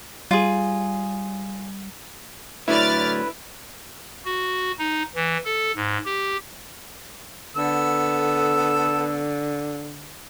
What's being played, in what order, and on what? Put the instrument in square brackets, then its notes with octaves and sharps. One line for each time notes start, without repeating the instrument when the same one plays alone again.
[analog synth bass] G3 [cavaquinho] F4 G#4
[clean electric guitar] A2 D3 F#3 [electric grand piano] E4 [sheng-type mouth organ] B4 [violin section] D5 F6 A6
[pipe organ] F#4
D#4
E3
A4
G#2
G4
[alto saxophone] D3 [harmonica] B3 A4 E6